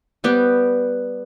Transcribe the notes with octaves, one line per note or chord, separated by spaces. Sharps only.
G3 B3 G4